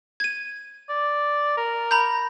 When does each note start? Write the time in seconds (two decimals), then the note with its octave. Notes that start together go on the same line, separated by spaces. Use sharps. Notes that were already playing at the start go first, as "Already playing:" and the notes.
0.20 G#6 D#7
0.89 D5
1.57 A#4
1.91 A#5 B5 G6